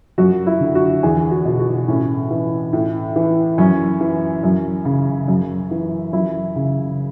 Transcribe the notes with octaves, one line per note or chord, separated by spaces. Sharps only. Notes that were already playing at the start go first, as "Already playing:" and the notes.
F#2 F#4
E4
D3
F#4
E2 G#4
F#4
B2
F#4
A2 C#4
E3
A2
E3
F#2 C#4
E3
F#2
C#3
F#2
E3
F#2 E4
C#3